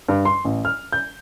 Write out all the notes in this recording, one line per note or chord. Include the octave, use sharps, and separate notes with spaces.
G2
C6
A1
F6
G6